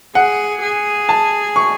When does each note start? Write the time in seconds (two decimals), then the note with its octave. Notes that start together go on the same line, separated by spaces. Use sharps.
0.15 G#4 F#5
0.62 G#4
1.09 A5
1.56 C#6